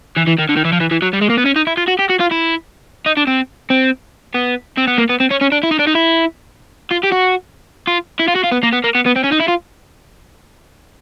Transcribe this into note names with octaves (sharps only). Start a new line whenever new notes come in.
E3
E3
D#3
D3
D#3
E3
F3
E3
E3
F#3
G3
G#3
A#3
B3
C#4
D#4
E4
F4
F#4
G4
F#4
F4
E4
D#4
D4
C4
C4
B3
C4
B3
A#3
B3
C4
C#4
C#4
D4
E4
D#4
D4
D#4
E4
F4
G4
F#4
F4
E4
F4
F#4
F4
B3
A#3
B3
A#3
B3
B3
C4
C#4
D#4
E4
F4